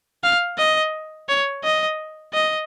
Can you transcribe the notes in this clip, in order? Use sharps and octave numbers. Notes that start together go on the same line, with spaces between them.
F5
D#5
C#5
D#5
D#5